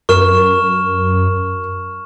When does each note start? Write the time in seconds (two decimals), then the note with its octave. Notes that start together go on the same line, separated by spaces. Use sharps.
0.09 F#2 A#4 C#6 F6 E7